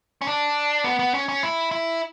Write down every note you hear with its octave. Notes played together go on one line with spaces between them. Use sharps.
C#4
D4
B3
B3
C#4
C#4
E4
E4